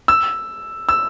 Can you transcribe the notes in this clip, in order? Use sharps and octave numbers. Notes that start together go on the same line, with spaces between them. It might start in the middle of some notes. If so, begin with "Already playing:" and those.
E6
E6